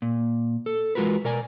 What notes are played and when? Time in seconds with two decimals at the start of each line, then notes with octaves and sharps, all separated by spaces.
0.02 A#2
0.66 A4
0.95 E2 G#3 F4 F#4 A#4 B4
1.24 B2 A#4 D5 G#5